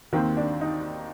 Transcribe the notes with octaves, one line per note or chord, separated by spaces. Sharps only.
D#2 D#3 C4
D4
D#4